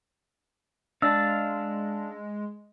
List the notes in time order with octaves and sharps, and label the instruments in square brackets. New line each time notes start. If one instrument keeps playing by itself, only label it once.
[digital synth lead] G#3 [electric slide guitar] D4 [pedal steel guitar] F5 A5 [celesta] E6